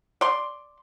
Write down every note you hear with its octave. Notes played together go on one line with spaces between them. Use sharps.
D5 C6